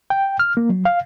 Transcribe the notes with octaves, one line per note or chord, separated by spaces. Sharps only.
G5
F6
A#3
F#3
F5